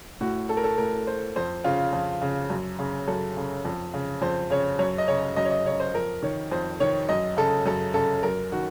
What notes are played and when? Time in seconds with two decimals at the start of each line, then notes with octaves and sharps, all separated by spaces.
0.21 A2 F#4
0.49 A4
0.57 A#4
0.64 A4
0.78 A2 A#4
1.07 C5
1.36 F2 C5
1.64 C#3 F4
1.93 F2
2.22 C#3
2.50 F#2
2.79 C#3
3.08 F#2 A4
3.37 C#3
3.65 F2
3.94 C#3
4.22 F2 C5
4.50 C#3 C#5
4.79 F#2 C#5
4.98 D#5
5.08 C#3 C#5
5.36 F#2 D#5
5.45 C#5
5.51 D#5
5.66 C#3 C#5
5.80 C5
5.94 F2 A#4
6.23 D#3 C#5
6.52 F2 C5
6.80 D#3 C#5
7.09 F#2 D#5
7.37 C#3 A4
7.66 F#2 A4
7.94 C#3 A4
8.23 F#2 A#4
8.52 D#3 F#4